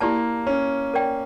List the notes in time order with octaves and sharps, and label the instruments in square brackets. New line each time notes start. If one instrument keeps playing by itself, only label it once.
[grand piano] A#3 [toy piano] E4 G4 D5 A5
[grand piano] C#4
[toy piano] A#4 D5 G5